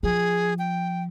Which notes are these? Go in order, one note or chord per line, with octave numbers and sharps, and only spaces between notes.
F3 G#4
G5